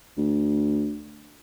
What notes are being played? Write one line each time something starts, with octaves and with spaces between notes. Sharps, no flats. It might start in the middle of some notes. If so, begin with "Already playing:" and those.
D2